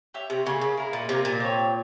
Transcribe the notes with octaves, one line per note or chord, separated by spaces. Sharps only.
G4 C#5 E5
C3
C#3 A#3 F4 G#4
C#3
E4 A#4 F5
A#2
C3 A#3 F4 A#4
A#2
C4 G4 C#5